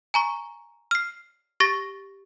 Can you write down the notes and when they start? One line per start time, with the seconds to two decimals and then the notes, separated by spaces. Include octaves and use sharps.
0.14 G#5 A#5 C#6
0.91 F6 C7
1.60 G4 C#6 A6 A#6